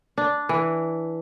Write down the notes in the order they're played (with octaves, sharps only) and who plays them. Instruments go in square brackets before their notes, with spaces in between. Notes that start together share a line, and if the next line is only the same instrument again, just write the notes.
[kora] D4
E3